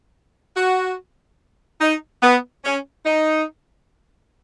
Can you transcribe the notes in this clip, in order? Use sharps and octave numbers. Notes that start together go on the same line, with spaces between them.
F#4
D#4
B3
C#4
D#4